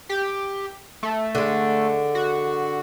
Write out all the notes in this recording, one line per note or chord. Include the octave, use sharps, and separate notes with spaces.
G4
A3
D3 G#3
F#4